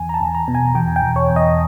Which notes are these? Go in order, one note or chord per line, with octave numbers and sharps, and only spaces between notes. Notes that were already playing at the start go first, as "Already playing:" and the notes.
Already playing: E2 G#5
A#5
A5
E2
A#5
B2
G#5
E2 G5
G5
E2
C#5
E2
D#5